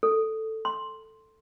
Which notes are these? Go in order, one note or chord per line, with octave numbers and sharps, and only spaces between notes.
A4
C6